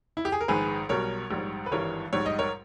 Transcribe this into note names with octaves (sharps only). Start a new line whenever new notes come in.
E4
G4
G#4
A#4
A#1 G#2 D#3 G#4 B4
B1 B2 G3 A#4 C#5
A#1 G#2 G3
B4
G#1 G2 E3 G3 A#4 C#5
A#1 G#2 G3 C#5
D#5
A#4 C#5